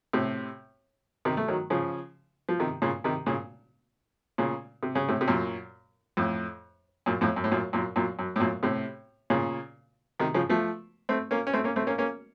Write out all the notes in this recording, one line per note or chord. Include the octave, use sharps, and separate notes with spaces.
A2 C3
C3 D#3
A3
D#3 F#3
C#3 F3
F3
C3 D#3
A#2 C#3
C3 D#3
A#2 C#3
A#2 C#3
C3
C#3
A2 C3
C3
F#2 A#2
F2 A2
F#2 A#2
F2 A2
F#2
A2
F#2 A#2
F#2 A#2
F#2 A#2
F#2
A2
F#2 A#2
A2 C3
A#2 C#3
C3 D#3
C#3 F3
F3 A3
A3 C4
A#3 C#4
C#4
A3 C4
A#3 C#4
A3 C4
A#3 C#4
A#3 C#4